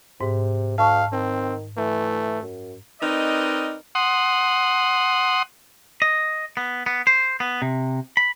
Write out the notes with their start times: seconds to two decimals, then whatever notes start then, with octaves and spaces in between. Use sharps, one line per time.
0.21 G#2 C3
0.78 D2 F5 A5 C#6
1.13 D#3 C4
1.77 E3 A3
2.42 F#2
3.01 C4 D#4 A#4 B4 D5 D#5
3.95 F#5 C6 D#6
6.02 D#5
6.57 B3
6.86 B3
7.07 C5
7.40 B3
7.62 C3
8.17 B5